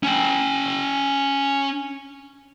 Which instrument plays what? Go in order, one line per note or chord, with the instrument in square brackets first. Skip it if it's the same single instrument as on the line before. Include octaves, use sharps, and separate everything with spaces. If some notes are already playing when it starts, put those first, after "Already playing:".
[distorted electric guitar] C#4 G5